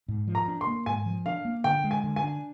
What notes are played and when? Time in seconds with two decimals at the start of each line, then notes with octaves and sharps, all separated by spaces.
0.08 G#2
0.28 F3
0.35 A#5
0.48 D4
0.61 C6
0.67 A#3
0.86 G#2 G#5
1.06 F3
1.26 D4 F5
1.45 A#3
1.64 D3 G5
1.84 G#3
1.91 G#5
2.04 D3
2.16 G#5
2.24 D4